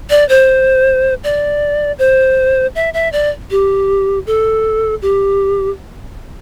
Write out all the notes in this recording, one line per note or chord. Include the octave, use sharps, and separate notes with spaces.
D5
C5
D5
C5
E5
E5
D5
G4
A4
G4